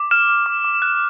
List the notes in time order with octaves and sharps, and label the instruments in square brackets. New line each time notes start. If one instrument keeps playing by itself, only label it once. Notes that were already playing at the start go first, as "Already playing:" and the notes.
Already playing: [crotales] D6
F6 E7
F6
D6
D6
F#6